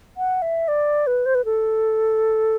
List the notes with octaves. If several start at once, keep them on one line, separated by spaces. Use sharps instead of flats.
F#5
E5
D5
B4
C5
B4
A4